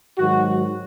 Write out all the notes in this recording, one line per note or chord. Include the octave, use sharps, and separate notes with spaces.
G#2 D#3 F#3 F#4